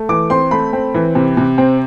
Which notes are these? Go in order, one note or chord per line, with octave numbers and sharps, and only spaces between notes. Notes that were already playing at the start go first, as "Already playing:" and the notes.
Already playing: A3
E3 D6
C4 C6
A3 B5
C4
E3
C3
C3
C4